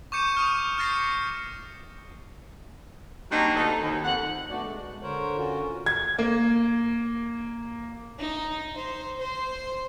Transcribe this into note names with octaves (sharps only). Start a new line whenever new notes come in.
C#6 D6 G6 C#7 D#7 E7
C#6 D#6 F6 G6
F6 G6 A6 A#6 C7 C#7
F#3 G3 A#3 C4 D4 D#4
D2 D#4 A4
D#2
F2 F#5
A3 B3 D4 F#4 D5
G#3
D3 A#4 C5 C#5
D3 C#4 F4 F#4
G#6
A#3
D#4
C5
C5